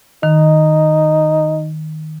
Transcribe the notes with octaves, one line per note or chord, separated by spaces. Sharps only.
D#3 D#4